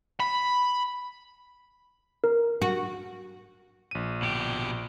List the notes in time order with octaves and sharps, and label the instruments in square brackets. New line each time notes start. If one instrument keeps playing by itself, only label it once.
[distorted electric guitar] B5
[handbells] A#4
[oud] F#4
[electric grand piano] A#1 D#7
[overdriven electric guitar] B2 G4